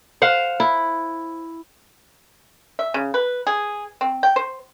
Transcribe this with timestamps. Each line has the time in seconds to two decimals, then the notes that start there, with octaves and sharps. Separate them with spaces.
0.22 C5 F5 F#5
0.60 E4
2.79 E5
2.94 C#3
3.14 B4
3.47 G#4
4.01 C4
4.23 G5
4.36 C5